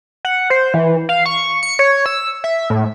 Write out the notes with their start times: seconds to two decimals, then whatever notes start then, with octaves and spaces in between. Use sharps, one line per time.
0.25 F#5
0.50 C5
0.74 E3
1.09 F5
1.26 C#6
1.63 C#7
1.79 C#5
2.06 E6
2.44 E5
2.70 A2